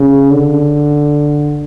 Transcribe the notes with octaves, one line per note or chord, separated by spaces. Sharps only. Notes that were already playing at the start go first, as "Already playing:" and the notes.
Already playing: C#3
D3